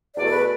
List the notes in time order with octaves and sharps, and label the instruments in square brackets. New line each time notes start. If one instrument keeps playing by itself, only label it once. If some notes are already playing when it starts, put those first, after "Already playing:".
[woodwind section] E2 B2 A3 D5
A4
B4